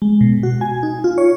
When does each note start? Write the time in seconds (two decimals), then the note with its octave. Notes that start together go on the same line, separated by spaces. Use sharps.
0.02 G#3
0.21 B2
0.43 F#4
0.61 G#5
0.83 D#4
1.04 F4
1.18 C#5